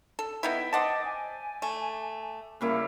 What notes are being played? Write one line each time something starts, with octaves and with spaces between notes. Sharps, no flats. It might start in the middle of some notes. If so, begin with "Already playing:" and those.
A4
B3 D#4 E4 E5 G5
C5 D5 D#5 F#5 A5
G#5
A3
C#3 G3 A#3 E4